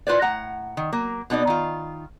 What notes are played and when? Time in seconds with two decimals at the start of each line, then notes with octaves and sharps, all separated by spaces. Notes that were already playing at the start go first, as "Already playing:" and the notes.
0.07 E4 F4 B4 C5 D5
0.22 A2 F#5 A#5
0.77 D#3
0.93 F#3 A#3
1.30 B2 B3 D#4 D5
1.47 D#3 F4